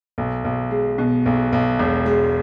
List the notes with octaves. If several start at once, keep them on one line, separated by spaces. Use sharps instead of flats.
B1
B1
G#3
B2
B1
B1
E1
G#3